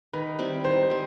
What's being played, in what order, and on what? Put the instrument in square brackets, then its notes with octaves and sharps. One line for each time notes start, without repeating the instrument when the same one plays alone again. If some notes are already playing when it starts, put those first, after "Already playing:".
[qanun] D#3 [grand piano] B4
[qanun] G3 C4 E4
[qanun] D#3 [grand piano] C5
[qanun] G3 C4